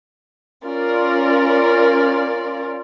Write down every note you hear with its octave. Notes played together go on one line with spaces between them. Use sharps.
C#4 F4 A#4 D5